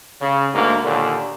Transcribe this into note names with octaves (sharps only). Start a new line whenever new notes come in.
C#3
D2 G#2 A#3
D#2 A#2 D3